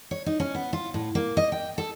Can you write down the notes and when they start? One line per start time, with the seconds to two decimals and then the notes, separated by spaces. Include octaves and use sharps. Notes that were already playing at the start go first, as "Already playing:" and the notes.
0.11 C#5
0.26 D#4
0.40 C#4
0.55 B3
0.73 F4
0.94 A2
1.15 A#3
1.37 D#5
1.52 G5
1.78 A4